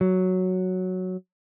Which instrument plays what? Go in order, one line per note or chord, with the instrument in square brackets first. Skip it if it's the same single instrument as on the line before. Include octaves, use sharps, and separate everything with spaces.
[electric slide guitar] F#3